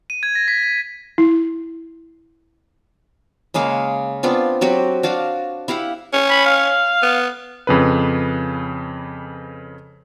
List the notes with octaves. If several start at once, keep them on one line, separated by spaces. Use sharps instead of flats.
D#7
G#6
A#6
B6
B6
E4
C#3 G#3 A#3 F5
B3 C4 D4 F4
F#3 C4 F#4 G4
D4 F#4 F5
E4 G4 F5 F#5
C#4
B5
F5
B3
F2 C#3 B4